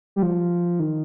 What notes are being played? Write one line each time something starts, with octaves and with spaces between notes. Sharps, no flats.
G3
F3
D#3